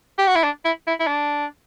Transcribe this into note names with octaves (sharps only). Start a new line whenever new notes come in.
G4
F#4
E4
D4
E4
E4
E4
D4